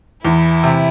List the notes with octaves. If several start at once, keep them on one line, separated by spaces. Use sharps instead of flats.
E2 E3 E4
C3